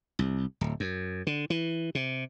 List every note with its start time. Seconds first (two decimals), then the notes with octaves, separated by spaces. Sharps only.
0.19 C2
0.61 D1
0.80 F#2
1.27 D3
1.50 E3
1.95 C3